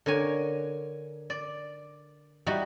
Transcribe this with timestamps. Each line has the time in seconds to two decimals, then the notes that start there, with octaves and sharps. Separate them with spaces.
0.06 D3 A#4 C#5 G#5
1.30 D5
2.46 G3 D#4 E4 F#4